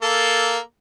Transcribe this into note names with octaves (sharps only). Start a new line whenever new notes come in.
A#3 A4